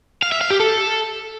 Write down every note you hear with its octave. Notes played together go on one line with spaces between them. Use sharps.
F5
E5
F5
G4
A4